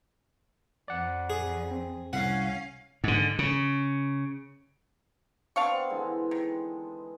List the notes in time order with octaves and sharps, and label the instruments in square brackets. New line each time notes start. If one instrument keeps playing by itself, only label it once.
[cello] F2 [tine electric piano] D5 F#5
[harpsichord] G#4
[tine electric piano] C4
[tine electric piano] C2 [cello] C#4 F5 [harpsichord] F#5
[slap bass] G#2 D3
C#3
[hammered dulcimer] B3 C4 [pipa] D4 F5 C#6
[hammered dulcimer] D3 E3 G#3
[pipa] D#3